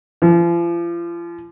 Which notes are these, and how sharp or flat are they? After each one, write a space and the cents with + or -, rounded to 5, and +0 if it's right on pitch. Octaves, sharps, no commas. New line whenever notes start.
F3 -40